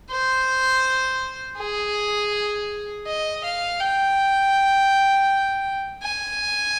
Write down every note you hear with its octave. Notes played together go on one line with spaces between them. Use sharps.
C5
G#4
D#5
F5
G5
G#5